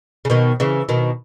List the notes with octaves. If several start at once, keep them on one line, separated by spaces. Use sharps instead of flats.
C#3
B2 D#3
C#3 E3
B2 D#3